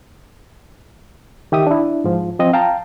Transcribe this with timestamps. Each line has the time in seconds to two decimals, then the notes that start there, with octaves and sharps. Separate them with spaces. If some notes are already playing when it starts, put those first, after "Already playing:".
1.52 D#3 G4 E5 D#6
1.67 D4 E4
2.04 G#2 F3
2.39 F3 C4 D#5
2.53 F5 G5 A5 A#5